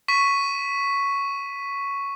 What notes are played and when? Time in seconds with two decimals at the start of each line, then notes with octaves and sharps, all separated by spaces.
0.08 C#6 B6 D#7